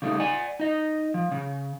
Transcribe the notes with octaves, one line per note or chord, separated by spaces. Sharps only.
C#3 G3 A3 C#4 D#4
D5 F#5 G#5
D#4 D#5
F3
C#3